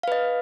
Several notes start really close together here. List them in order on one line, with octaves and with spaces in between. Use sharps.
F5 B4 D#5